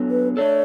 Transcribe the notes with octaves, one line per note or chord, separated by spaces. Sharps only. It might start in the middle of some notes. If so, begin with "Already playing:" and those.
Already playing: F#3 B3 D4 A4
B4
A3 D4 A4 C#5